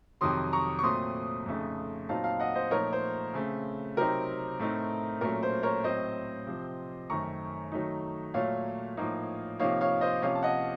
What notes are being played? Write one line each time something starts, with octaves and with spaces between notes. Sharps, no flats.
F2 C3 D#3 F#3 C6 D#6
A#5 C#6
C#6
A#2 F#3 A3 C4 C6 D#6
F2 C#3 A3 D#4
A#2 F#3 C4 D#4 F5 A5
F5 A5
D#5 F#5
C5 D#5
A#2 F3 A3 D#4 A#4 C#5
C5
C#3 A3 C4
C3 F#3 C4 D#4 A#4
A2 A3 C4 D#4
A#2 F#3 A3 C#4 A#4
C5
A#4 C#5
A2 F#3 C4 C5 D#5
C3 F3 C4
F#2 D#3 A3 A#5 C#6
D#3 F#3 A3 D#4
A#2 F#3 A3 C#5 F5
A2 F3 A#3 D#4
C3 F3 A#3 D#4 C#5 F5
C#5 F5
C5 D#5
C3 F3 A#3 C#4 C#5 F5
A5
D#5 F#5